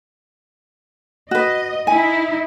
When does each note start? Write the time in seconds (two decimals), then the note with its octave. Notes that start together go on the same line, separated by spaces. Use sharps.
1.31 F#4 B4 D#5
1.87 D#4 E4 G#5